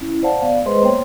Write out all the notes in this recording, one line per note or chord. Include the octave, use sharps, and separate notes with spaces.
C#4 E4
C5 D5 F5 F#5 A5
B3 D5 F5
G#3 G#4 B4 C5 D#5 C6
A#3 B3 C5 C#5 G5 C6